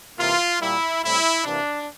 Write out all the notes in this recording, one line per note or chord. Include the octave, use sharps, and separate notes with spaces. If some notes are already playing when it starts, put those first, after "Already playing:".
C3 E3 A#3 F4
A#2 G3 A#3 E4
A2 G3 C4 E4
C3 E3 A#3 D4